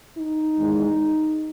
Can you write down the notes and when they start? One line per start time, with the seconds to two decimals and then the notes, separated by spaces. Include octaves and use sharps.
0.17 D#4
0.57 E2 D#3 G#3